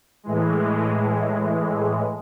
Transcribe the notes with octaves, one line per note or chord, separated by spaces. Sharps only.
A2 E3 G#3